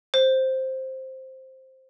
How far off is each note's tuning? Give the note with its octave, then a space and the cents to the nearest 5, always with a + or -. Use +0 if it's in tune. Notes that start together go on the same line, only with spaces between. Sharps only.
C5 +5